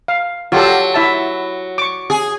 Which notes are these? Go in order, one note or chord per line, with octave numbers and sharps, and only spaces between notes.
F5
F#3 F4 G4 A4
E4 E5 A5
C#6 D6
G#4